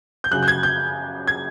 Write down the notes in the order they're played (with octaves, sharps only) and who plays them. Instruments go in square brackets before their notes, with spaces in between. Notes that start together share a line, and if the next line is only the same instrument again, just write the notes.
[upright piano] G6
F#2 C#3 F#3 F#6
G6
G#6
G6
G#6